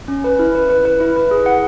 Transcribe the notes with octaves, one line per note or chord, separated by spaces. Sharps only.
C#4
B4
E4
B4
B4
B4
E4
B4
G#4
F#5